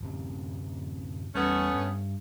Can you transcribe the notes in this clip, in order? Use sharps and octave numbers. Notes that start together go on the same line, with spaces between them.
D1 F#2 C3
E2 G3 A3 B3 C#4
G2